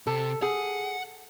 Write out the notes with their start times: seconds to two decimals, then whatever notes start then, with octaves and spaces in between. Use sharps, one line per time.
0.07 C3 A4
0.42 G#4 F#5